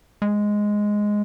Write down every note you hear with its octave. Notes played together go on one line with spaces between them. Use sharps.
G#3